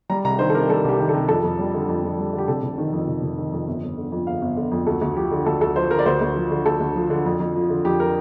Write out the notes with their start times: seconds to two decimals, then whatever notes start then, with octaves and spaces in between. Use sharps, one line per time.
0.10 G3 A#5
0.24 C2 A#5
0.39 D#3 C5
0.50 A4
0.54 C3 A#4
0.69 G3 A4
0.84 C2 G4
0.99 D#3
1.09 A4
1.14 C3
1.28 F2 A4
1.44 F2
1.59 G3
1.74 D3
1.88 F2
2.04 F2
2.18 G3
2.33 D3
2.38 G4
2.48 F1 A4
2.63 F1
2.78 D#3
2.93 F2
3.08 F1
3.22 F1
3.38 D#3
3.52 F2
3.67 G1
3.82 G1
3.97 D3
4.12 F2
4.27 G1 F5
4.42 G1
4.56 D3
4.71 F2
4.86 D2 A4
5.01 D2
5.16 F3 G4
5.31 D3
5.46 D2 A4
5.61 D2 A4
5.76 F3 C5
5.91 D3 A#4
5.99 D5
6.06 D2 C5
6.21 D2
6.36 F3
6.51 D3
6.65 D2 A4
6.80 D2
6.96 F3
7.10 D3
7.26 F2
7.40 F2
7.55 F3
7.70 D3
7.85 F2 G4
8.00 A#4